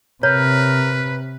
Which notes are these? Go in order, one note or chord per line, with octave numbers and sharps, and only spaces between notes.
C3 A#4 B4 C#5